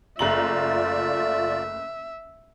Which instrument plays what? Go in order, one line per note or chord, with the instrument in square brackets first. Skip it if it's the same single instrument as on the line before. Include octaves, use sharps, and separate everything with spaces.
[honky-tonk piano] F#1 A#5 F#7 [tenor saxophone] A3 [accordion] F4 D5 [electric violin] E5